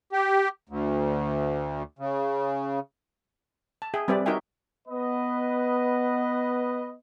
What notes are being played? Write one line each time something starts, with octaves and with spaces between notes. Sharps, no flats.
G4
D2
C#3
A5
G#4 E5 G5
G3 C4 G4 B4 D5 E5
D#4 F#4 A#4 E5 G5 G#5
B3 B4 D#5